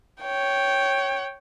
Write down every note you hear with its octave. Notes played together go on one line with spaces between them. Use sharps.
C#5 G5